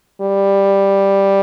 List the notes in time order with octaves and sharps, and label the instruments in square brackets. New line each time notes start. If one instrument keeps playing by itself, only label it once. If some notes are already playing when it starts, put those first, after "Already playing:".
[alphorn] G3